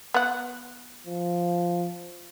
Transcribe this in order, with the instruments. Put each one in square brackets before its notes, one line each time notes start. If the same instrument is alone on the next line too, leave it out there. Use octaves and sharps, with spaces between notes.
[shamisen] B3 F#5
[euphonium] F3